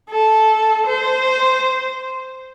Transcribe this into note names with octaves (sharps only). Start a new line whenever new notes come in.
A4
C5